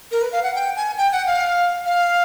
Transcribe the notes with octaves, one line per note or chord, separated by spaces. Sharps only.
A#4
B4
F5
F#5
G5
G#5
G5
F#5
F5
F5